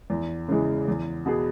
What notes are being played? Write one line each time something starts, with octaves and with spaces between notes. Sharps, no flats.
E2
C#3 E3 G#3
E2
B2 B3 G#4